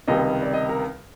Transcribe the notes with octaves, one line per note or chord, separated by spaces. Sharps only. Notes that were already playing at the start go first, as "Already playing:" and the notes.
C#2 C3 D#3 G3 D#5
D5
D#5
A#4